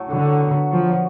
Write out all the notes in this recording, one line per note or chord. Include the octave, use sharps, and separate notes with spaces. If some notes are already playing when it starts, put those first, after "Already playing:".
Already playing: A2 F#3 A3
D3 F#4
F#3
B3
B4
F3 F#4
F#3